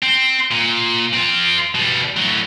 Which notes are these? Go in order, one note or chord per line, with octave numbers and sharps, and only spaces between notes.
C4
A#2
C4 F4
B2 G3
A2 F#3